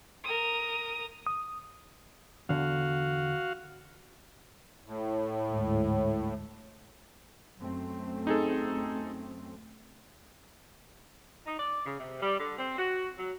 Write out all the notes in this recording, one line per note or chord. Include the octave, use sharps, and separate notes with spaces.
A#4 D#6
D#6
E2 D3 F#4 F5
A2
D2 G#2
F#2 A3 C4
D#4 G#4 A4
D#4
D5
C#3
C3
G3
D3
C4
F#4
F#3